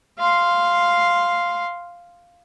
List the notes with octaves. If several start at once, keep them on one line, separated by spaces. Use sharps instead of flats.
F5 C6